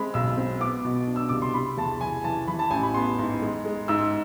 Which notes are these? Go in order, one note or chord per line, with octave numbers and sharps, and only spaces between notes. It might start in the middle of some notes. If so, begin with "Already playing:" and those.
Already playing: G#3 C4 B5
B1 E6
C4
B3 D6
B2
D4
E6
C2 D6
C6
C3 B5
E2 A5
E3 G#5
E3 A5
E3 B5
A5
A1 G#5
B5
B3 C6
G#2
G#3
G#3
G#2 E6